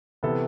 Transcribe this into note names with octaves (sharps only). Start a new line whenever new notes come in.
C3 E3 B3 A4